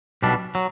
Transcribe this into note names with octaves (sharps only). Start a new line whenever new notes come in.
B1 B2 G3 D4
F#3